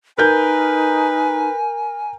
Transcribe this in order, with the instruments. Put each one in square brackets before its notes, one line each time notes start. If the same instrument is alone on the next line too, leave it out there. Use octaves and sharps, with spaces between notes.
[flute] D#4 [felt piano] A#4 G6 [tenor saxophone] B4 [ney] G#5